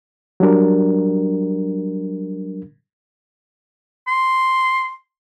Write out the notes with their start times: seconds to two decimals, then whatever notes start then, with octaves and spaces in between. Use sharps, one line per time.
0.40 F#3 G3 D4 A#4
4.08 C6